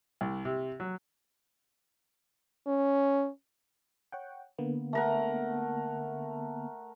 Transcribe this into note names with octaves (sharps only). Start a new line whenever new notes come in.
C2
C3
F#3
C#4
C#5 F#5 G5
D3 A#3 B3
A3 A#4 F#5